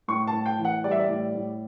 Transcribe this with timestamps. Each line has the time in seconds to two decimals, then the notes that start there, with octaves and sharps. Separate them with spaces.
0.08 A2 C#6
0.27 A5
0.33 A2
0.46 G5
0.59 E3
0.65 F#5
0.84 G3 D5
0.91 E5
0.99 D5
1.09 A2
1.35 A2